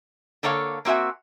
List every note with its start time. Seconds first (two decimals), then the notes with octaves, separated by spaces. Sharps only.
0.43 D3 A#3 A4 C#5 E5 F5
0.85 A#3 C4 F#4 E5 G#5